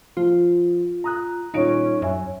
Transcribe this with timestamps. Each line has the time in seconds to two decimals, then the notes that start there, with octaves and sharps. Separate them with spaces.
0.17 F3 F4
1.04 A#5 D#6 F#6
1.54 D#1 C#4 D#4 F4 D7
2.02 F#2 C#5 E5 G#5